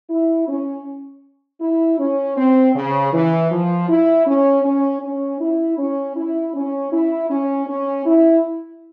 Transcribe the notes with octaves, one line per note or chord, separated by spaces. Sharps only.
E4
C#4
E4
C#4
C4
C#3
E3
F3
E4
C#4
C#4
C#4
E4
C#4
E4
C#4
E4
C#4
C#4
E4